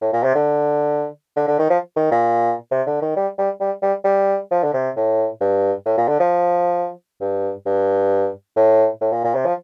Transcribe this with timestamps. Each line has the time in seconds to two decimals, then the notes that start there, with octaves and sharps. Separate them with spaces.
0.01 A2
0.13 A#2
0.24 C3
0.35 D3
1.37 D3
1.48 D3
1.59 D#3
1.70 F3
1.96 D#3
2.11 A#2
2.71 C3
2.87 D3
3.02 D#3
3.16 G3
3.39 G3
3.60 G3
3.82 G3
4.04 G3
4.51 F3
4.63 D3
4.74 C3
4.96 A2
5.41 G2
5.86 A2
5.98 A#2
6.08 D3
6.20 F3
7.21 G2
7.66 G2
8.56 A2
9.01 A2
9.12 A#2
9.24 A#2
9.35 C3
9.45 F3